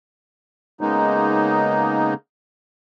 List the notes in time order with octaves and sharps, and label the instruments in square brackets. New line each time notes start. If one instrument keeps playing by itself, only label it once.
[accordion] C#3 G#3 A#3 B3 D#4